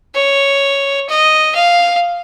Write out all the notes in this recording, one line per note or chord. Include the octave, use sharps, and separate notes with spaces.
C#5
D#5
F5